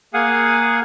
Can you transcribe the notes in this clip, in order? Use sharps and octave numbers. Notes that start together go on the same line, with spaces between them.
A#3 G#4 F5 F#5 G#5 D#6